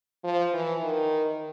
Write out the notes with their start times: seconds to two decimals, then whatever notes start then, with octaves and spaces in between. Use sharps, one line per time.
0.24 F3
0.54 E3
0.83 D#3